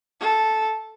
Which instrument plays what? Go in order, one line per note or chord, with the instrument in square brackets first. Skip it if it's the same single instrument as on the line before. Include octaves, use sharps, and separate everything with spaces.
[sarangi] A4